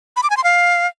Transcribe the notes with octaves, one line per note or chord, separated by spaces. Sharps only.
B5
D6
G#5
C6
F5